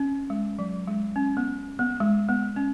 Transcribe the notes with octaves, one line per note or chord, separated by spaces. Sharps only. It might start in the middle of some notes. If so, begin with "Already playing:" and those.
Already playing: C#4
G#3
F#3
G#3
C#4
B3
B3
G#3
B3
C#4